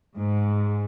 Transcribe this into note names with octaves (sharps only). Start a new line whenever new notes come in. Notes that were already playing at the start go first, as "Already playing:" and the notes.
G#2